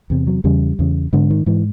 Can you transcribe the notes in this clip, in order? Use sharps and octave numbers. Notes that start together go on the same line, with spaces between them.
E2 C3
F#3
E2 C#3 G3
E2 C#3
G#2 D3
D#3
G#2 E3